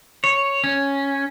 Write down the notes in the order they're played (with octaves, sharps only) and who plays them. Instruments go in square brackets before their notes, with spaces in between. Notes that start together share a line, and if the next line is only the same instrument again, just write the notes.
[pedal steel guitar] C#5
C#4